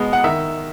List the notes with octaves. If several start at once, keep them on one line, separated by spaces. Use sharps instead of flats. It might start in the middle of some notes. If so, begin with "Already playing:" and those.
Already playing: B2 G#3 B3
F#5
D#3 E5